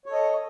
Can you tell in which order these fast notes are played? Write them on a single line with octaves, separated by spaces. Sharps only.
C#5 A4 D#5